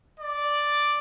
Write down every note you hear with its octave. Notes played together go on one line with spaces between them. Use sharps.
D5